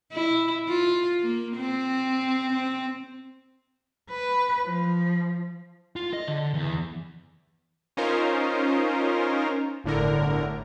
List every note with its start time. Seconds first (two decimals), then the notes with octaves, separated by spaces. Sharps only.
0.12 E4
0.68 F4
1.22 A#3
1.56 C4
2.53 C4
4.10 B4
4.66 F3
5.96 F4
6.13 D#5
6.28 D3
6.54 E2
7.97 C#4 D#4 F4 A#4 C5
9.84 G1 A2 D3 A#4